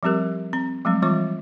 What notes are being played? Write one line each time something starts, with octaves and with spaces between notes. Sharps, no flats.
F3 G3 C4 G4 A#4
C4 A#5
F3 F#3 G#3 A3 C4
E3 G3 C4 F4 C#6 D6